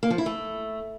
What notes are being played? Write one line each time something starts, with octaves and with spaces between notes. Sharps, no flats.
A#3
F3
E4
A3